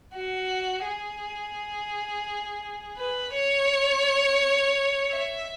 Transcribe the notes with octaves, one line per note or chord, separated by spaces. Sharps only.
F#4
G#4
B4
C#5
E5